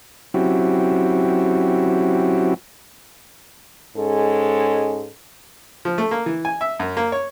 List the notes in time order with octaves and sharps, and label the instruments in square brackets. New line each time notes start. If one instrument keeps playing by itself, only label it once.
[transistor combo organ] F#3 C4 C#4 E4 F#4 G4
[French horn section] G#2 G#3 C#4 A4
[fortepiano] F3
A3
A#3
E3
G#5
E5
F#2
A#3
C#5